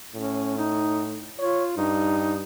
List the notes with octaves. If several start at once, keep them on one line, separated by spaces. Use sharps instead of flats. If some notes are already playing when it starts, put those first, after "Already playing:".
A2 C#4
D#4
F4 C#5
G2 D#4